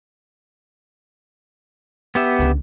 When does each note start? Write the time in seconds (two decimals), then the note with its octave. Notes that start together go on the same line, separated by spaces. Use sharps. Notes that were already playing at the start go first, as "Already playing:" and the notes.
2.15 B3 G4 E5
2.39 C#2 D3